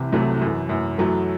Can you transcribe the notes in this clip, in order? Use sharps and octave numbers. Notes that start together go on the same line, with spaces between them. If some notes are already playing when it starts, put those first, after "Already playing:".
Already playing: C2 C3 E3
C2 C3 E3 F#3 A3
F#2 E3
F#2 E3
F#2 E3 F#3 A3